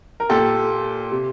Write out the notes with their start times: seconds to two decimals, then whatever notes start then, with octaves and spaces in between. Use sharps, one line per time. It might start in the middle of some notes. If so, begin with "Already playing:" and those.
0.20 A#4
0.29 A#2 G4 A4
1.11 C3